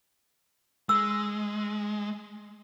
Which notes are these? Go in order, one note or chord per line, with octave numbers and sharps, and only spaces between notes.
G#3 E6